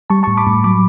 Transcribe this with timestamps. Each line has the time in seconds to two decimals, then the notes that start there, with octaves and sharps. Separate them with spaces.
0.10 G3 A5 C#6
0.23 A2 A5 C#6
0.37 B5 D6
0.47 A2
0.64 F#3 B5 D6